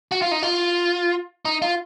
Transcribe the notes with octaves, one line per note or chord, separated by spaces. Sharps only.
F#4
F4
D#4
F4
D#4
F4